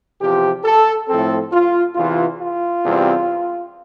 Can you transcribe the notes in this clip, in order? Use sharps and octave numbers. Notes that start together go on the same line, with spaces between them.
E2 C3 F3 G4
A4
A2 F3 C4 A4
F4
E2 C3 E3 F4
F4
E2 C3 G3 C4